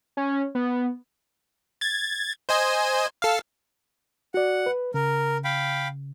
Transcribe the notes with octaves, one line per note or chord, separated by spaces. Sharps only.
C#4
B3
G#6 A6
C5 D#5 G#5
A4 F5
F#4 D5 F#5
B4
C#3 A#4
F5 G5 B5